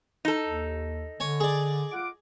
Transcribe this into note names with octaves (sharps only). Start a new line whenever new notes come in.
D#4 A4
D#2
D3 C#5 G#5
G#4 D5
F4 F#5 D6